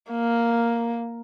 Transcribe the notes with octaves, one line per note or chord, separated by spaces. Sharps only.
A#3